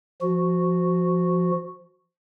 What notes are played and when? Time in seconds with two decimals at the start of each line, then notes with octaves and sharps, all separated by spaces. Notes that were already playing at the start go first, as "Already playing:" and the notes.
0.22 F3 F#4